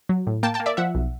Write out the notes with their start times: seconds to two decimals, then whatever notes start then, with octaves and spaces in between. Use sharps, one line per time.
0.09 F#3
0.27 A2
0.43 A#3 G5 A5
0.54 G5 A5
0.60 A#3
0.66 D5 E5
0.77 F3 E5 F#5
0.95 B1